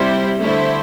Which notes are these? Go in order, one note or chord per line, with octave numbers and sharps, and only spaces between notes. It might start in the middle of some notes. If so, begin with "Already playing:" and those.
Already playing: C3 G3 E4 C5
D3 A3 E4 C5